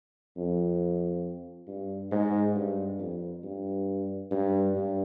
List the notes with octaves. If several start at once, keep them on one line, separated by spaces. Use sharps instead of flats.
F2
G2
G#2
G2
F2
G2
G2
G2